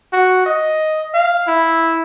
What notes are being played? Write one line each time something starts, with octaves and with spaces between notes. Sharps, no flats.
F#4
D#5
F5
E4